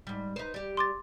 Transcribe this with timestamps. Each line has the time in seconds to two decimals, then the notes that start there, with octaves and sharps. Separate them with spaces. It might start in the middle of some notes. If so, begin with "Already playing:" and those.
0.07 G#2 G3
0.36 D#4 B4 C5
0.54 G3 G4
0.77 C6 D6 A6